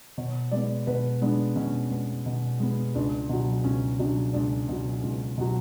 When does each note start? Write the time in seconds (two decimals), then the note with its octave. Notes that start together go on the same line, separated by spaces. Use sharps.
0.17 B2 C#5
0.51 G#3 B3 D5
0.87 B2 B4
1.22 G#3 B3 D4
1.56 B2 C#4
1.91 G#3 B3
2.26 B2
2.60 G#3 B3
2.95 C#2 D4
3.29 B2 F#3
3.64 C#2 C#4
3.99 B2 F#3 D4
4.33 C#2 D4
4.68 B2 F#3
5.03 C#2
5.37 B2 F#3